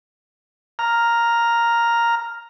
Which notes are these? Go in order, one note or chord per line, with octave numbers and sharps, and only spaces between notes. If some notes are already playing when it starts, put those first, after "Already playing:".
A#5 F6